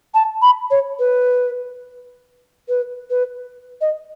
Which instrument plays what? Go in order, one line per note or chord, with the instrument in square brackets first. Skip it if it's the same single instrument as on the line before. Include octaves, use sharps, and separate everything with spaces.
[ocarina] A5
B5
C#5
B4
B4
B4
D#5